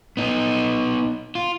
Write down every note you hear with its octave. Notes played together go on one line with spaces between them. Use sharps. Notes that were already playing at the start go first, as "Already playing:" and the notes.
B3 D#4
F4